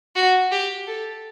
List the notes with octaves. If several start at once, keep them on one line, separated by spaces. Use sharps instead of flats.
F#4
G4
A4